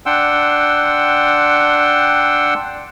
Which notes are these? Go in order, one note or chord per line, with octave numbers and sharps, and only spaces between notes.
D4 F#5 G5 C6 E6